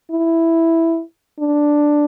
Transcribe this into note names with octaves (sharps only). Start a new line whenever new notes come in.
E4
D4